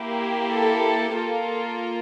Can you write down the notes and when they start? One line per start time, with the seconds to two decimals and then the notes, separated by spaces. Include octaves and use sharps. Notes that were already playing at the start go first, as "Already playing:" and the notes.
Already playing: A#3 E4 G4
0.53 A4
1.16 A#3 F4 A4